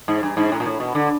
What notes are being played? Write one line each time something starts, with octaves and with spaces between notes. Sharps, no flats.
G#2
G2
G#2
A2
A#2
A2
B2
D3